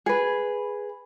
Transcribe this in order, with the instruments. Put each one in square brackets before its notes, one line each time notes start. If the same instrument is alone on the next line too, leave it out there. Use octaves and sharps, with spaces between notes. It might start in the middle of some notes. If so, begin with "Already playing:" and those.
[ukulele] G#4 B4